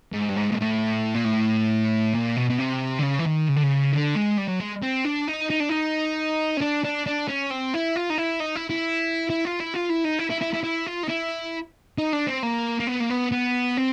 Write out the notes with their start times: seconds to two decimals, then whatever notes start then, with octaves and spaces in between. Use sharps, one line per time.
0.12 G#2
0.29 G2
0.36 G#2
0.50 A#2
0.58 A2
1.14 A#2
1.24 A2
2.14 A#2
2.36 B2
2.50 B2
2.59 C3
2.99 D3
3.03 C#3
3.19 E3
3.26 D#3
3.48 C#3
3.56 D3
3.63 C#3
3.93 D3
4.16 G#3
4.38 G3
4.48 F#3
4.60 G#3
4.82 C4
5.05 D4
5.28 D#4
5.50 D#4
5.60 D4
5.69 D#4
6.57 C#4
6.61 D4
6.84 D4
7.06 D4
7.28 C#4
7.51 C4
7.74 E4
7.96 F4
8.10 D#4
8.18 E4
8.40 D#4
8.55 E4
8.70 E4
9.30 E4
9.45 F4
9.59 E4
9.74 F4
9.89 E4
10.04 D#4
10.19 E4
10.30 E4
10.41 E4
10.53 E4
10.64 E4
10.86 F4
11.03 D#4
11.09 E4
11.98 D#4
12.13 D4
12.27 C4
12.43 A#3
12.80 A#3
12.87 B3
13.00 A#3
13.10 B3
13.32 B3
13.77 C4